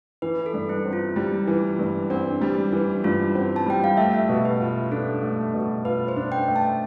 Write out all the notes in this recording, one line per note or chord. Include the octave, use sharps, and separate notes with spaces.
E3 B4
A4
G2
E4
C4
F4
G3 E4
E3
G2
C4 D4
G3
E3
G2 F4
C4
A5
G3 G5
F5
A3 E5
B2
B4
F4
D4 A4
A3
B2
F4 B4
C5
D4
G5
A3
A5